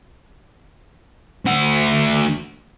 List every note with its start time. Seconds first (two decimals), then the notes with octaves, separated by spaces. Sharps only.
1.46 D2 F#5